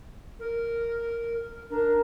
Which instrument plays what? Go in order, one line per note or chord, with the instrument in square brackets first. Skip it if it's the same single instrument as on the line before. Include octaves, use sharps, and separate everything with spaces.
[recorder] A#4
[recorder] D4 [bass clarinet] A#4